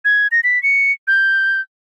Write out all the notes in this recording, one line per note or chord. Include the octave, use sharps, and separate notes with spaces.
G#6
A#6
B6
C#7
G6